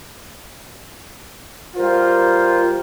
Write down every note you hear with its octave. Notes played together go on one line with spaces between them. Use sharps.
G3 F4 A#4 C5